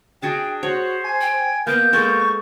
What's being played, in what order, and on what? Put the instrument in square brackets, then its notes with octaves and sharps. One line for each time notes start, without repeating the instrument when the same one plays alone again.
[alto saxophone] D4 [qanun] F#4 G#4 A5 [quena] G5
[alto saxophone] F#4 [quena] C5 [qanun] C#5
[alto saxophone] G#5
[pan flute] G5
[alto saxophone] A#3 [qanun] B3 [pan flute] B4 [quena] G6
[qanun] G#3 A4 [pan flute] C#6